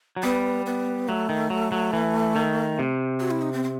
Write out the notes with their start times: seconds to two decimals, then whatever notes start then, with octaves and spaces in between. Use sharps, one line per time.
0.16 F#3
0.23 G3 B3
0.66 B3
1.08 F#3 A3
1.29 D#3
1.50 F#3
1.72 F#3
1.93 E3
2.36 D#3
2.79 C3
3.20 F#4
3.31 E4
3.42 D#4
3.53 C4
3.63 C4